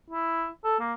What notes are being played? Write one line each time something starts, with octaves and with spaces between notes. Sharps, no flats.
E4
A4
A#3